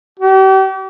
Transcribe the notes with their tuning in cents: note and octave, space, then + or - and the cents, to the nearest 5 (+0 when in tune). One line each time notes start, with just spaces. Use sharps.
G4 -40